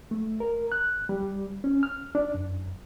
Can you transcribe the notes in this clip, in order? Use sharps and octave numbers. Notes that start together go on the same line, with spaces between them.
A3
A#4
F#6
G3
C#4
F6
D4
F#2